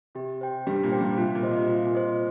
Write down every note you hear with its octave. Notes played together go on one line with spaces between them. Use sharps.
C3 G4
C5 G5
G2 G3 G4
A#2 A#3
C5 G5
G2 G3
C3 F4
A#2
C5 D#5
C3
C3 F4
A#2
C5 D#5